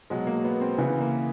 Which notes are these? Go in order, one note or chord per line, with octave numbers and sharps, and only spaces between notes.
B2 F#3 G#3
A#3
B3
C4
C#3 E3 B3
A#3